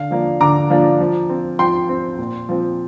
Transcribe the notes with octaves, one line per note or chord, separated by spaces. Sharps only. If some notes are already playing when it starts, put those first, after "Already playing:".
Already playing: D3 F5
F3 A#3 D4
D3 A#5 D6
F3 A#3 D4
F3
C4
F3 G5 C6
C4
A#2
F3 C4